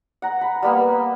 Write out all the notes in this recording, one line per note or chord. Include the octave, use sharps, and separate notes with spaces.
F#5 A#5
B5
G3 A#3 B3